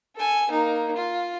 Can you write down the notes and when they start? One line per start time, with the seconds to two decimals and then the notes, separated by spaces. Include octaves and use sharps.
0.16 A4 G#5
0.50 A#3 D#4
0.96 F4